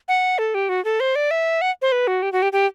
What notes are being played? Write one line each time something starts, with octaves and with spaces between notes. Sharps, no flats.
F#5
A4
G4
F#4
A4
C5
D5
E5
F#5
C5
B4
F#4
G4
F#4
G4
G4